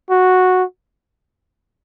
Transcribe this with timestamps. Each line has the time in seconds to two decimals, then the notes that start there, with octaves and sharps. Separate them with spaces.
0.10 F#4